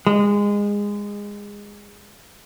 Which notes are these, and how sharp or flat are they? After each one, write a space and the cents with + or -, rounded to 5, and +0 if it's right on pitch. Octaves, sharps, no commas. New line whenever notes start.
G#3 -20